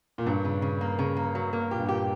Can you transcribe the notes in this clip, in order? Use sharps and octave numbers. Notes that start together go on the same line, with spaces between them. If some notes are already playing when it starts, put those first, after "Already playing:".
A#2
G2 F#3
C#3
C#3
A#3
C#3
A#3
F#3
A#3
A#2 G4
G2
A#2 G4